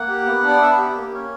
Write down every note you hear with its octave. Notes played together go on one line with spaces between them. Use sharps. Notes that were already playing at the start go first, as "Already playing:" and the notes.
Already playing: A#3 F#5
G4
B3
D4
D5
B3 E5
G4
A#3
C#4